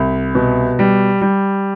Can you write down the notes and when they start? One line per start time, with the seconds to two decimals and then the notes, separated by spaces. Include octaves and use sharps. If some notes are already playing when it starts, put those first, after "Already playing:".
Already playing: C2
0.35 B2
0.79 G3
1.21 G3